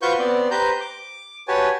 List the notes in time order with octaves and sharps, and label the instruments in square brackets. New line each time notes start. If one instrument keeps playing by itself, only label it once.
[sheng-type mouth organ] F4 F#4 B4 C5 C#6 G6
B3 C4 D5
G4 B4 C5 A#5 G6
D6
F#4 G4 B4 C#5 G#5 A5